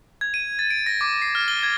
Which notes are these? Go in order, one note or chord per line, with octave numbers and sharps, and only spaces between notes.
G#6
D#7
A6
D7
A#6
D6
C7
F6
G7
G#6